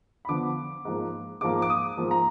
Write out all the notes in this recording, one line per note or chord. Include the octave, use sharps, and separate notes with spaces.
B5
D3 F3 B3 D4 D6
G#2 F3 A#3
G#2 F3 A#3 D6
D6
D#6
G#2 F3 A#3
A#5